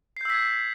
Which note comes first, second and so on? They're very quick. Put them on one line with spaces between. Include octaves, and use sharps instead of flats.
C7 G6 E6 B6 G#6